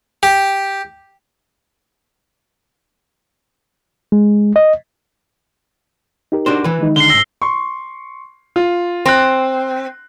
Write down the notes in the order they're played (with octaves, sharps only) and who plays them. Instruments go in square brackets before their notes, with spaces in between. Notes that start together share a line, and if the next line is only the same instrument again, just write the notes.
[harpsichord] G4
[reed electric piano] G#3
D#5
D#4 G4 A#4
[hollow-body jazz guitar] D4 F#4 C5
E3 B4
[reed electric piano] D#3 G#3 D#4
[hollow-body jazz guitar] D3 [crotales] C7 G7
[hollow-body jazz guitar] B1 G#2 [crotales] E6 A#6 G7
[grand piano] C6 C#6
F4
[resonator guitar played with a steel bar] C4 [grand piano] C6 F#6